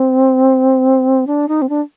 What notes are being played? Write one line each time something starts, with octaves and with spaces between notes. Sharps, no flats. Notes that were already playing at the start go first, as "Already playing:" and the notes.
Already playing: C4
D4
D#4
C4
D4